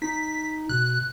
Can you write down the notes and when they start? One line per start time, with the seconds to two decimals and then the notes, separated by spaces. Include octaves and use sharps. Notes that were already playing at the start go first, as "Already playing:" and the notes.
0.02 D#4 B6
0.69 B2 F#6